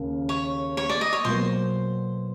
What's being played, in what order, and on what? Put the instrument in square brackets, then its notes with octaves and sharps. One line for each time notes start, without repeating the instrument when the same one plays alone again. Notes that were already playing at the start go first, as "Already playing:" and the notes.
Already playing: [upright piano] D#2 C#3 A#3 C#4
[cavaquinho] C#5
C#5
D5
D#5
C#5
[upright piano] B2 F#3 A#3 [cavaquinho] C5